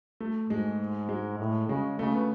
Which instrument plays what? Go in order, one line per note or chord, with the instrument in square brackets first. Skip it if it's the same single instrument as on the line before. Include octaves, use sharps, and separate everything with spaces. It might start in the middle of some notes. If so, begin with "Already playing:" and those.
[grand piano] A3
[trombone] G#2 [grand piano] G#3
[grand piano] G#3
[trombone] A2
[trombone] C#3 [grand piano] G#3
[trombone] C#3 [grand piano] A3
[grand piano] B3